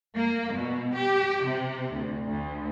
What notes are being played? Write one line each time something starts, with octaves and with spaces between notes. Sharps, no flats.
A#3
B2
G4
C3
D2
D2